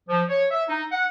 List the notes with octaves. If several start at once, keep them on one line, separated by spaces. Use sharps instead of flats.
F3
C#5
E5
D#4
F#5